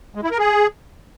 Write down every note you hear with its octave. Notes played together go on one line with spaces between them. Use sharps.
G#3
E4
A#4
G#4